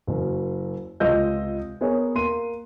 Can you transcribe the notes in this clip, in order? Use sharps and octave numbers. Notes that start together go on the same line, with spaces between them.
F#1 F#2
C#2 C3 F4 D#5 E6 G6
B3 G#4 A#4 B4 C#5
A#3 C6 D#7